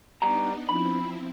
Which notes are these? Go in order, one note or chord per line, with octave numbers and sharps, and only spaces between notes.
G3 B3 D4 D#4 A#5
F3 C4 E4 B5